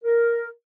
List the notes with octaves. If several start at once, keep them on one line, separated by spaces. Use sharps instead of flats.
A#4